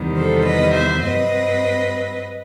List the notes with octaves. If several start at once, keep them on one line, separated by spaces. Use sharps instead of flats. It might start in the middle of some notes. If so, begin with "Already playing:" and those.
Already playing: E2 C3 D#3 G3
A4 C5
B4 D#5
C5 E5
G2 F#3 C4 B4 D#5